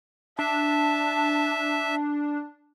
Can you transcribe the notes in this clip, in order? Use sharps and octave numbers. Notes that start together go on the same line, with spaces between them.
D4 E5 A5